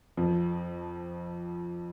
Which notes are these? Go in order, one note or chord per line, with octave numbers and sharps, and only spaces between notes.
F2 F3